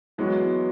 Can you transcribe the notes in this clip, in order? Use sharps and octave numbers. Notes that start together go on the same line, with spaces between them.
E3 F#3 G#3 B3 F#4